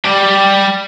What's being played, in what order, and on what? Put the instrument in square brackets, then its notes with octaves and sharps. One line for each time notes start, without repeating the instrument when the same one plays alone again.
[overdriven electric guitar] G3 G4